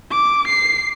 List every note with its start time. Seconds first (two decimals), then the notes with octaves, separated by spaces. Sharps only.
0.11 D6
0.48 C7